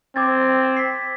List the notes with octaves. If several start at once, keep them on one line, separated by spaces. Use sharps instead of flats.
C4 D6 G#6 A6
B6 C7